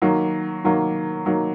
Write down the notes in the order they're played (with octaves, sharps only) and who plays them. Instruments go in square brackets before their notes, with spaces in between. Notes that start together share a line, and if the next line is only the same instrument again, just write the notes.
[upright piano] D#3 F#3 A#3
D#3 F#3 A#3
D#3 F#3 A#3